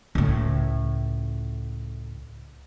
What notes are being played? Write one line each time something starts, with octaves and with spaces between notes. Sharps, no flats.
C#2 A2